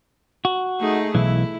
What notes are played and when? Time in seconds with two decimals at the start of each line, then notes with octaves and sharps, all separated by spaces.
0.45 F#4
0.80 A3 D#4 G#4
1.15 B1 E3 E4